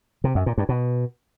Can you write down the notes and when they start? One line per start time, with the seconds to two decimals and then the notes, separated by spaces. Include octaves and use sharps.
0.24 C3
0.35 F#2
0.46 A#2
0.58 G2
0.69 B2